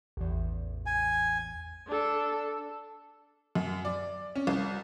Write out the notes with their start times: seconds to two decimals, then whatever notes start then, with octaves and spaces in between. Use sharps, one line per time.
0.17 A1 E2
0.86 G#5
1.87 D4 A4
3.55 F#2
3.85 D5
4.35 C#4
4.47 C2